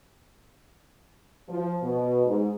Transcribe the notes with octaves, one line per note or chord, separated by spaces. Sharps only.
F3
B2
G#2